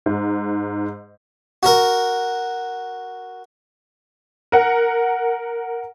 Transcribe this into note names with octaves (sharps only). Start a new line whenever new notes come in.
G#2
F#4 A#4
A#4 F#5